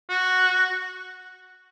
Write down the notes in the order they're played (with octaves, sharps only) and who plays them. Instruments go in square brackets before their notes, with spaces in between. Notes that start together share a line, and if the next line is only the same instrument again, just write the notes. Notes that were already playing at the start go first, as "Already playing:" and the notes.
[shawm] F#4